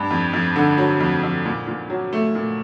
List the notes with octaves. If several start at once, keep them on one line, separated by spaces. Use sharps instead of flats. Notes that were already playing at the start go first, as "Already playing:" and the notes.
Already playing: G2
F2
F2
D3
F#3
F2
F2
A#2
A#2
F#3
A3
A#2